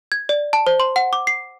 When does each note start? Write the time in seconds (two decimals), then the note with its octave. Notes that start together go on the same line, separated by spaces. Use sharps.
0.12 G#6
0.29 D5
0.53 A5
0.67 C5
0.80 C6
0.96 F#5
1.13 D6
1.27 C7